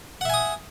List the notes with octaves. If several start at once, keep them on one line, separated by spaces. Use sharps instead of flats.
E5 F#5 G#5 D#6